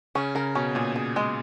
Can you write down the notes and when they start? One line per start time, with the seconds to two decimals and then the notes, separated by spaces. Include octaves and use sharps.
0.15 C#3 C#4
0.35 C#3 A#4
0.55 B2 C#4
0.75 A#2 G#4
0.96 G#4
1.16 G#3